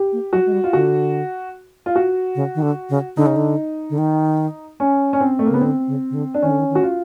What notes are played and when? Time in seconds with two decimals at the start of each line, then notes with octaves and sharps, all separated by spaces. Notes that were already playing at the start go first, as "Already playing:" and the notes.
Already playing: G4
0.13 A#3
0.33 F#3 F#4
0.46 G#3
0.53 G3
0.64 F4
0.73 D3 F#4
1.86 F4
1.95 F#4
2.35 C#3
2.55 D#3
2.62 D3
2.90 C#3
3.17 D3 D#4
3.26 C#3
3.36 D3
3.90 D3
3.98 D#3
4.80 C#4
5.13 C#4
5.20 C4
5.39 A3
5.46 C#3 A#3
5.54 B3
5.61 D3 C4
5.87 C#3
6.10 C#3
6.14 D3
6.34 D4
6.42 D#3 C#4
6.51 D3
6.59 D#3
6.70 D#3
6.75 F#4
6.83 F4